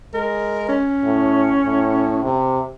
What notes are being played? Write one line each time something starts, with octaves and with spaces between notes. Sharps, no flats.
G#3 A#4
C#4
A2
A2
C3